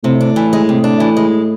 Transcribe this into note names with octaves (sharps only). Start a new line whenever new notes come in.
A2 C3
D4
E3
G#3
C3
D4
E3
G#3